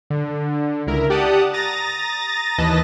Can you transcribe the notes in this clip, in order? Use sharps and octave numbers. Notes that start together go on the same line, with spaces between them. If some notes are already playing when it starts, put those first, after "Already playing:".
D3
C#2 E4 A#4
G4 D5 F#5 A5 D#6
A#5 D#6 A6 A#6
D#2 E3 B4 D#5 A5 A#6